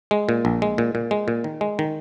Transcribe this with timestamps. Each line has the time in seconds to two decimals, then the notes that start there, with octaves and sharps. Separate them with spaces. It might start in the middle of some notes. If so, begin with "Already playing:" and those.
0.11 G#3
0.29 A#2
0.45 A#1
0.62 G#3
0.78 A#2
0.95 A#2
1.11 G#3
1.28 A#2
1.44 D#3
1.61 G#3
1.79 D#3